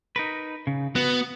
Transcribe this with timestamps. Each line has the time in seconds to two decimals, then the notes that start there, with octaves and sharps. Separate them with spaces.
0.16 D#4 A#4 B4
0.67 C#3
0.96 B3 F#4